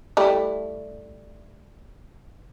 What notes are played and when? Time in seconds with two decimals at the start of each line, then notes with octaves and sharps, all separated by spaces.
0.17 G3 A3 E4